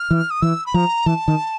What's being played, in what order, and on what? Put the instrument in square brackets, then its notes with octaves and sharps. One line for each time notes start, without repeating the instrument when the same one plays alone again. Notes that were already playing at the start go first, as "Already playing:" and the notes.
Already playing: [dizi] F6
[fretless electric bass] E3
[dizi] D#6
[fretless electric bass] E3 [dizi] E6
[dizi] B5
[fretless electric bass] F3 [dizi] A#5
[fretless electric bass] E3 [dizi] A5
[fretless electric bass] D#3